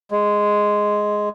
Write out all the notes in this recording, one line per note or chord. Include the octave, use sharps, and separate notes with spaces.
G#3